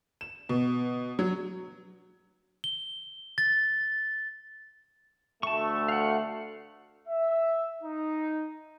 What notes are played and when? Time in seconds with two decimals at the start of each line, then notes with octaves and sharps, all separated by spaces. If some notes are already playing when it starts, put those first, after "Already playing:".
0.21 E7
0.49 B2
1.19 F#3
2.64 G7
3.38 A6
5.43 D2 A3 A5 C#6
5.89 F5 F#5
7.08 E5
7.83 D#4